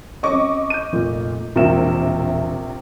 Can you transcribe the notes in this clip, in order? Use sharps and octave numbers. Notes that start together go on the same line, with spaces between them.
C4 C#4 D#5 C#6 D6
G6 D#7
F1 A#2
E1 A#1 C3 A#3 E5 E7